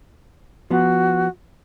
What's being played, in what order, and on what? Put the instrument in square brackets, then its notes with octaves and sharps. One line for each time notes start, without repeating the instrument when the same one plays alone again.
[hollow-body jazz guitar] F3 B3 [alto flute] F#4